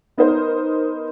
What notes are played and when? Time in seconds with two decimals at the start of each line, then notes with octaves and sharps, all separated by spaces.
0.17 B3 D#4 A#4 C5